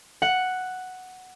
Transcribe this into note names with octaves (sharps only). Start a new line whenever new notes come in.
F#5